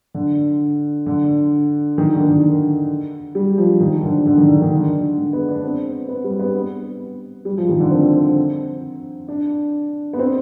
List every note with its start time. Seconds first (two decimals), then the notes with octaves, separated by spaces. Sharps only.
0.14 D3
1.06 D3
1.98 D#3
2.13 D3
2.29 D#3
3.35 G3
3.58 F3
3.80 D#3
4.03 D3
4.26 D3
4.38 D#3
4.50 D3
4.62 D#3
4.74 D3
5.17 G#3
5.33 B3
5.48 D4
5.63 C4
6.09 B3
6.24 G3
6.39 B3
7.45 G3
7.58 F3
7.69 D#3
7.80 D3
7.91 C4
9.28 D4
10.13 B3
10.19 C4